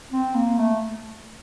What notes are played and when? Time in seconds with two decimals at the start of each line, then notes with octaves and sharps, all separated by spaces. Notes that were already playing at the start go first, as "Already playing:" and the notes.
0.11 C4
0.35 A#3
0.58 A3